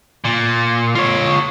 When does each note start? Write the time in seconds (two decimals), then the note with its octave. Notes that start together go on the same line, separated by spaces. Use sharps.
0.24 A#2
0.95 F4 C#5